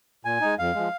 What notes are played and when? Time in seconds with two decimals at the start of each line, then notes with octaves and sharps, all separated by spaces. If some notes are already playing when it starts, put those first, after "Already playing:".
0.25 A#2 G#5
0.41 G#3 D#4
0.59 F2 F5
0.75 F3 G#3